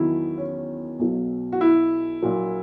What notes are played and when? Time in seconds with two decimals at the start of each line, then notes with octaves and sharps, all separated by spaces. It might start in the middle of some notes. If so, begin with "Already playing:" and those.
Already playing: E2 D#3 F#3 E4
0.38 C#4
0.99 B1 B2 F#3
1.52 F#4
1.61 E4
2.22 A#1 A#2 F#3